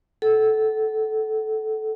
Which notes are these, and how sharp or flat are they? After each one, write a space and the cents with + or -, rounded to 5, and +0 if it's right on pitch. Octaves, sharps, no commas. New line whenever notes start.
A4 -15 F#5 +30